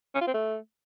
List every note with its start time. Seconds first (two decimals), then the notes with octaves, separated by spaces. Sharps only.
0.15 C#4
0.21 F4
0.27 C4
0.34 A3